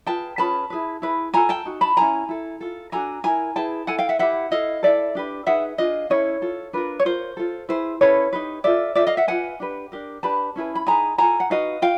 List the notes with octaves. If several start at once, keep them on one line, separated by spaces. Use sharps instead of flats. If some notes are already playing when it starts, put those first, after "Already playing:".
F4 G#4 B4 G5 A5
C#4 F4 G#4 B4 A5 B5
E4 G#4 B4
E4 G#4 B4
F4 A4 G#5 A#5
G5 A5
D#4 F#4
A5 B5
C#4 E4 G#4 G#5 A#5
E4 A4
F4 A4
D4 F#4 A4 G#5 A#5
E4 G4 A#4 G#5 A#5
E4 G#4 B4 G5 A5
E4 A4 F#5 G#5
F5 G5
E5 F#5
E4 G4 B4 E5 F#5
E4 A4 D#5 F5
E4 A4 D5 E5
D4 G4 B4
D#4 G#4 B4 E5 F#5
D4 F4 G#4 D#5 F5
C#4 E4 A4 C#5 D#5
F4 A4
D4 F4 A#4 B4
C#5
F4 A#4 C5
F4 A4
E4 G#4 B4 C5
C#4 E4 A4 B4 C#5
D#4 G4 B4
F4 A4 D5 E5
F4 A4 D5 E5
D#5 F5
E5 F#5
F4 G#4 B4 F#5 G#5
D4 G4 B4
D4 G4 A#4
D4 G4 B4 A5 B5
C#4 E4 G#4 B4
B5
D#4 G#4 B4 G#5 A#5
F4 A4 G#5 A#5
F#5
D#4 F#4 B4 D#5 F5
F4 F5 G5